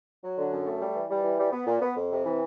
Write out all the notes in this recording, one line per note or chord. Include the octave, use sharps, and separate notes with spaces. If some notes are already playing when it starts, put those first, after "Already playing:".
F#3
D3
F#2
A3
G3
E3
G3
E3
G3
B3
A#2
B3
F2
C3
E3